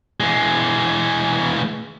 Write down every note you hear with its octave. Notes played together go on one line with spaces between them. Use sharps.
E3 G#3